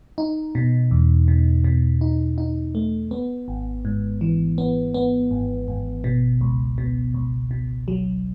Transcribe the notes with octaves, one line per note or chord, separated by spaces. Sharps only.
D#4
B2
E2
B2
B2
D#4
D#4
A3
B3
G#1
G#2
E3
B3
B3
G#1
G#1
B2
C#2
B2
C#2
B2
F#3